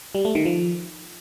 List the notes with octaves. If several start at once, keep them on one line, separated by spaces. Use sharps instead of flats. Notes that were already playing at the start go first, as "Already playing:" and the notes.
G3
A3
D#3
F3